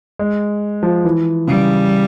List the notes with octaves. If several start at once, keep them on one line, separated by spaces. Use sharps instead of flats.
G#3
F3
E3
C#3 G3